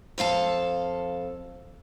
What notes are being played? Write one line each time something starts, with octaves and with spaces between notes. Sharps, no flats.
F2 A4 F5 A5